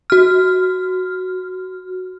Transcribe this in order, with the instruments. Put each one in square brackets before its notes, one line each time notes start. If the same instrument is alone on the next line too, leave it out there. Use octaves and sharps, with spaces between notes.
[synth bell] F#4 F6